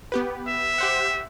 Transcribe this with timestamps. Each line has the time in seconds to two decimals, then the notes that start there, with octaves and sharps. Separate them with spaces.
0.12 B3 G4 B4
0.47 E5
0.78 G4 C5 F#5